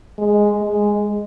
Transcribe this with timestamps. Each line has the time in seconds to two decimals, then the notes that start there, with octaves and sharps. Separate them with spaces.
0.18 G#3
0.62 G#3